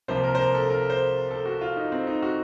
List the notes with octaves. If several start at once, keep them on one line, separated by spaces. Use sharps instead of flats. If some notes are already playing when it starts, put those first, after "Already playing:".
C2 C3 F3 A#3 C5
A#4
C5
A#4
A4
A#4
C5
A4
F#4
F4
D#4
C4
D#4
F#4